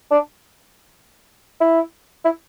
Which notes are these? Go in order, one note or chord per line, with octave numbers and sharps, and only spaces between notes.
D4
E4
E4